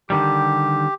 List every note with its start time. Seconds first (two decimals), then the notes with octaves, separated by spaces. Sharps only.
0.10 D3 D#3 G3 G4